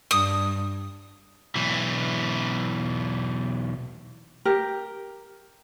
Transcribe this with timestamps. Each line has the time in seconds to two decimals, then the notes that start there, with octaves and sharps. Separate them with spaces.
0.11 G2 D#6
1.55 B1 E3
4.45 G4 A#4